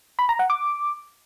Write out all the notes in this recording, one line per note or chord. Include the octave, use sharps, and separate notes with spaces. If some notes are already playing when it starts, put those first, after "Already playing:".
B5
A#5
F#5
D6